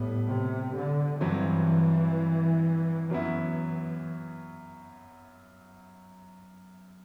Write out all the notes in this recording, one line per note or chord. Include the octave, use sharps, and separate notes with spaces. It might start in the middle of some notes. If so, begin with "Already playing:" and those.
Already playing: A2 G3 B3
C3
D3
G2 E3 F#3 C4
F#2 E3 F#3 B3 E4